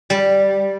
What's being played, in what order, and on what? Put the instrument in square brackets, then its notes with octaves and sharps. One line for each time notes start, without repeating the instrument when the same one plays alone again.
[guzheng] G3